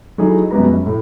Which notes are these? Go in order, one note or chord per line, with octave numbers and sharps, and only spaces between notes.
F#3 A3 D#4 E4 G#4
F#2 B2 G3 G#3 B4 A#5
F#2
A2